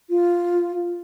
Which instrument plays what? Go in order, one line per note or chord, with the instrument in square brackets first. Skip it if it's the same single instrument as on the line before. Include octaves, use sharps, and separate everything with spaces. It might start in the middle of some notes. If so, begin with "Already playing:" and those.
[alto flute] F4